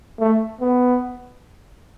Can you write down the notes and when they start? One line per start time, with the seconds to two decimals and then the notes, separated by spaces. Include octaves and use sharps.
0.20 A3
0.61 B3